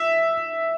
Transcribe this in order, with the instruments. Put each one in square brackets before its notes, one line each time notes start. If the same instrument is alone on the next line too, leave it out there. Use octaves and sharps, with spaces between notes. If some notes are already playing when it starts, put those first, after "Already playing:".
Already playing: [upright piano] E5